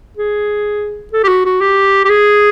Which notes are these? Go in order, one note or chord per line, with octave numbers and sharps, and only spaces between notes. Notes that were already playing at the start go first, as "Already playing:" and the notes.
G#4
A4
G4
F#4
F#4
G4
G4
G#4